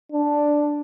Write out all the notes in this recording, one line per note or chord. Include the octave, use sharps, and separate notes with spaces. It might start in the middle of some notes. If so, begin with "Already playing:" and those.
D4